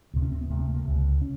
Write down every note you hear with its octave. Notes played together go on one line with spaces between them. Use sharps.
D2 C3
C#4
C4
B3
D2 C3 A3
A3
A#3
C#2 C3
C#4